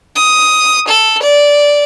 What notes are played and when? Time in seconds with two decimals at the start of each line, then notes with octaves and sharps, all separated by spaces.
0.16 D#6
0.88 A4
1.22 D5